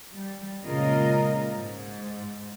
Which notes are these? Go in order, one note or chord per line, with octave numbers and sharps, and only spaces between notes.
G3
A#2 C#3 G#3 F4 A#4 D#5
G#2